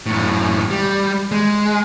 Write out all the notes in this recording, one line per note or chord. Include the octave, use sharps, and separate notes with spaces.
F#2 A2
G3
G#3